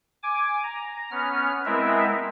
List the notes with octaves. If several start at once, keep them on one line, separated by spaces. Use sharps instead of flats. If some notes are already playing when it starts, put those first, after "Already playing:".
G#5 D6
A#5
B3 C#4 F6
G#3 B3 C4 E4 A#4 E5